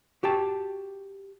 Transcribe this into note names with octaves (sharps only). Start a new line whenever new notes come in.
F#4 G4 G5 A5